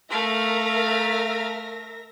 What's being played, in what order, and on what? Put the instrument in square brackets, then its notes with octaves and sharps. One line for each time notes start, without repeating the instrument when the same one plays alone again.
[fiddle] A3 F5 [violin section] A#4 E5 A#6